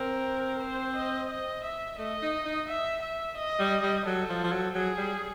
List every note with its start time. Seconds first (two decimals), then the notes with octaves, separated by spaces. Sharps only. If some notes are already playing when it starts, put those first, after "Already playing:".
Already playing: C4 A#4
0.61 C5
0.96 D#5
1.30 D#5
1.64 E5
1.98 A3 D#5
2.22 D#4
2.45 D#4
2.68 E5
3.02 E5
3.37 D#5
3.60 G3
3.83 G3
4.06 F#3 A4
4.29 F3
4.44 F3
4.52 F#3
4.75 F#3 G#4
4.98 G3